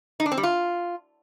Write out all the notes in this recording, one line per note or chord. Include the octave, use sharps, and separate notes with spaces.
D#4
D4
C4
G3
F4